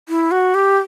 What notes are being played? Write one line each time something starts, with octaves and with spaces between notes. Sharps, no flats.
E4
F#4
G4